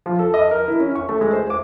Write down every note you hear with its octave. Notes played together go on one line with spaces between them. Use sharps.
F3
A4
D#5
A#4
E4
C#4
C#6
A3
G#3
C5
D6